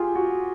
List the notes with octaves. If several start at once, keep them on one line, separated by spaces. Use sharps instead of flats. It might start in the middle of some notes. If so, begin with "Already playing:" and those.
Already playing: F4 G4 G#4
F#4